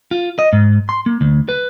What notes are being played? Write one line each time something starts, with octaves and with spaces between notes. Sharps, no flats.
F4
D#5
G#2
C6
A#3
D2
B4